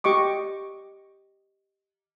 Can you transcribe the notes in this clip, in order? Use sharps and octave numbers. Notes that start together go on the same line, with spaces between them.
G4 D#5 C#6 D6